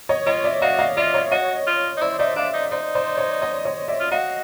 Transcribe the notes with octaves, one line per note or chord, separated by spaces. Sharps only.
C#5 D#5
F4 C#5 D#5
D5 E5
F#4 D#5 F5
D#5 F5
F4 D5 E5
C#5 D#5
F#4 C#5 D#5
F4
D#4
E4 C5 D5
D#4 D5 E5
D4 D#5 F5
D#4
D#4 C5 D5
C5 D5
C#5 D#5
C#5 D#5
C#5 D#5
D5 E5
F4
F#4 D#5 F5